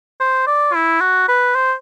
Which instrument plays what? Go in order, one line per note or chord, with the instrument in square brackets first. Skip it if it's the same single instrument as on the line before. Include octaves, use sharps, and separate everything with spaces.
[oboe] C5
D5
E4
F#4
B4
C5